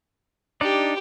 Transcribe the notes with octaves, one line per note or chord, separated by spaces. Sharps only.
D4 D#4 G4 D5